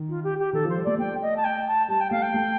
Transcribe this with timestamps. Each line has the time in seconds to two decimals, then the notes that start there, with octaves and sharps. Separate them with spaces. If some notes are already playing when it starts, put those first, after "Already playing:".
Already playing: D#3
0.09 F4
0.23 G4
0.39 G4
0.53 D#3 A4
0.65 F3
0.69 C5
0.76 G3
0.84 A3 D5
0.98 A3 G5
1.22 D#5
1.36 A5
1.44 G5
1.67 A5
1.88 G3 A5
2.00 G5
2.11 A3 F5
2.22 G5
2.34 A3